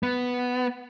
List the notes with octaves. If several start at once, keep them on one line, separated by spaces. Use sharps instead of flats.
B3